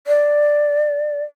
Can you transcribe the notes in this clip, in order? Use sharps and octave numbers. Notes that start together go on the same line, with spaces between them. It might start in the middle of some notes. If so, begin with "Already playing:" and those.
D5